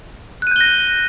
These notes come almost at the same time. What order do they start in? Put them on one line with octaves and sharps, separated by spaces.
F#6 D#7 G6 G7 A#6